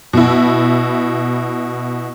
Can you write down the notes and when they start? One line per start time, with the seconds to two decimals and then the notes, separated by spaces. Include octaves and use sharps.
0.13 B2 E4